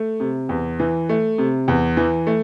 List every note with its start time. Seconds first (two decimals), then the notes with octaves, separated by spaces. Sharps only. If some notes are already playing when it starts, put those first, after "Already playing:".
Already playing: A3
0.20 C3
0.49 E2
0.80 E3
1.09 A3
1.38 C3
1.68 E2
1.97 E3
2.27 A3